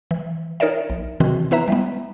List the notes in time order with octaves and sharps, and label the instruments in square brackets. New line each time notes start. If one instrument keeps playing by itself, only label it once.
[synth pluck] E3
D#4 A#4 C#5 D5 E5
A#1
C3 D#3 E3 C4 F#4
B3 E4 B4 E5 A#5
G3 G#3 B3